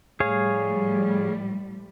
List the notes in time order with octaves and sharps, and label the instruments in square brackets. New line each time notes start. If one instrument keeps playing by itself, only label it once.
[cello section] A2 F3 G3 [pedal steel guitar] G#4 C#5 F5